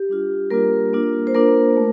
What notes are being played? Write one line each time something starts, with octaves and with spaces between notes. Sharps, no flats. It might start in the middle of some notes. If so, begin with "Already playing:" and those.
Already playing: G4
G3 D4 F4
G3 A#3 D4 F4 A#4
A#3 D4 F4
C5
A#3 D4 F4 A#4
A3